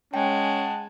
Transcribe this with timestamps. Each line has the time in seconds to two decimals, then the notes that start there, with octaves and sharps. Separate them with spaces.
0.14 G#3 C#4 F#5 G5 A5